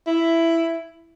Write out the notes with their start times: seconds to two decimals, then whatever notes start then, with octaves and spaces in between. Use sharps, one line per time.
0.07 E4